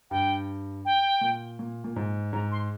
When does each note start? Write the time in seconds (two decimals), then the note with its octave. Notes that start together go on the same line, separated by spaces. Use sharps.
0.11 G2 G5
0.85 G5
1.21 A#2
1.59 A#2
1.84 A#2
1.96 G#2
2.33 G#2 A#5
2.52 C6